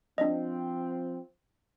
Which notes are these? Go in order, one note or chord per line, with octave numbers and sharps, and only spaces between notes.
F3 C4 D4 D#5